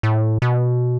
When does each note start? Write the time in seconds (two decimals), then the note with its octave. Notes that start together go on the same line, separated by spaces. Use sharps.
0.03 A2
0.42 B2